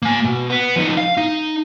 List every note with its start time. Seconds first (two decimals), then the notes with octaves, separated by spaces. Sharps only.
0.02 A#3 G#5
0.25 B2
0.50 B3
0.76 F3 D#4
0.97 F5
1.17 D#4